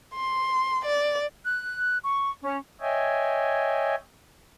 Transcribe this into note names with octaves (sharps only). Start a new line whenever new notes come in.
C6
D5
F#6
C#6
C#4
C#5 D#5 E5 G5 G#5